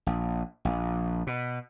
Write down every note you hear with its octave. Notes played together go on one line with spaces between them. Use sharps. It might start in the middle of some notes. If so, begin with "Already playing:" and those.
A#1
A#1
B2